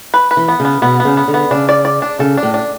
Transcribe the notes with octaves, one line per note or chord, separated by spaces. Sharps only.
B4
B4
E3
B3
C#3
B3
B2 B3
B3
C#3
B3
D3
B3
C#3 D4
D5
D5
D4
C#3 A4
D4
A2
D4